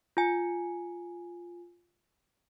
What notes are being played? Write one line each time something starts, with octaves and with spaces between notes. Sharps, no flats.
F4 G#5